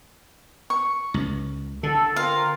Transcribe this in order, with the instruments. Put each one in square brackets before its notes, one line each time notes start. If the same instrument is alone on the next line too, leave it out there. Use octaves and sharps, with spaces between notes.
[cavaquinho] C#6
[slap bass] C#2
[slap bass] D3 [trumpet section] A4
[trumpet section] C4 F4 A#4 [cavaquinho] F5